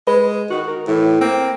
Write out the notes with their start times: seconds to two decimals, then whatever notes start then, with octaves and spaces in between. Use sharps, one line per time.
0.07 G#3 B4
0.50 D#3 F#4
0.68 A#4
0.88 A2 E3
1.21 A#3 C4